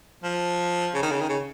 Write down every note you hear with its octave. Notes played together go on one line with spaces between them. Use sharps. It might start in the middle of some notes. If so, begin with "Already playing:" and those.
F3
C#3
D#3
C#3
D#3
C#3